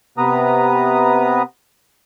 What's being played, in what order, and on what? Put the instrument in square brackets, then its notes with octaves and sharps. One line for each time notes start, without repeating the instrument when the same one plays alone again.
[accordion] C3 B3 B4 A#5 D#6